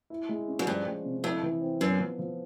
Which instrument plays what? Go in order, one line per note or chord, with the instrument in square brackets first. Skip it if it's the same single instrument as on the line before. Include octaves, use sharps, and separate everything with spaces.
[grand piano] E4
G#3
C#4
[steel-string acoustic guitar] F#2
[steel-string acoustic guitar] G2 [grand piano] F3
[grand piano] G#3
C3
[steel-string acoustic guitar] F2 [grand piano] E4
[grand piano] E3
C4
[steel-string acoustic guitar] F#2 [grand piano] B3
[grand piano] F3
F3